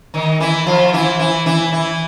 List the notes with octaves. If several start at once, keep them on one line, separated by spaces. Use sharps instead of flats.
D#3 D#4
E3 E4
F3 F4
E3 E4
E3 E4
E3 E4
E3 E4